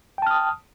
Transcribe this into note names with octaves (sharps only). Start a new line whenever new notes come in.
G5 A5 D#6 F6